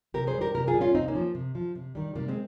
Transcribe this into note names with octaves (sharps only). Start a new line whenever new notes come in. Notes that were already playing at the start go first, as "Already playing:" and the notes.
C3 G4 A#4
G#4 C5
G3
G4 A#4
C3 G4 A#4
F4 G#4
G3
C#4 F4
C3 C4 D#4
A#3 C#4
F3
C3
F3
C3
D#3 G3
C3 G3 A#3
G#3 C4